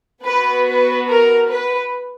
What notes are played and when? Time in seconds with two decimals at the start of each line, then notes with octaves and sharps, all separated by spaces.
0.24 B3 F#4 B4
0.66 B4
1.08 A#4
1.48 B4